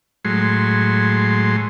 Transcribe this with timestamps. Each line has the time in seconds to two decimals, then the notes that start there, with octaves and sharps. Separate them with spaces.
0.25 A2 F#3 G#3 C6